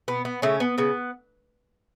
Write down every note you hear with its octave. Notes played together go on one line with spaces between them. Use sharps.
B2 B3
B3
C#3 A3 C#4
B3
C#3 B3